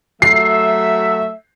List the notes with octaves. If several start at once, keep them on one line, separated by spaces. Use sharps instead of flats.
F#3 A3 E5 C7